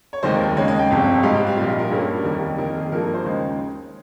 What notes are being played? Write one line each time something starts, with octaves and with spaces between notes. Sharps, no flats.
C#5
F1 D#2 D#3 G#3 C5
A#4
D#2 C#3 G#3 C#5
D#5
G5
G1 F2 C3
G#2 G3 C4 D#4 F5
G5
F5
A#1 A#2 G3 F5
D#5
A#4
G2 G3 A#3 C#4
F1 D#2 D#3 G3
F2 D#3 A#3 A#4
G#4
G2 F3 A#3 A#4
A#4
C5
D#2 C#3 G#3 D#4